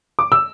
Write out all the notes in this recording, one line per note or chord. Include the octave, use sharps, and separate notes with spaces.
D6
E6